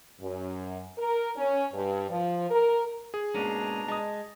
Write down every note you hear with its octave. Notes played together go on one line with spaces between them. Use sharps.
F#2
A#4
C#4
G2
F3
A#4
G#4
G#2 B2 A#3 C#4 D4 A#5
G#3 A5 D#6